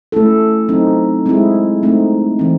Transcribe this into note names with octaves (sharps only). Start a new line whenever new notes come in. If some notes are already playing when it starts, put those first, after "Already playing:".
A3 C#4 E4 A4
F#3 C4 D#4
G#3 C4 E4 G#4
A3 C4 D#4
E3 C4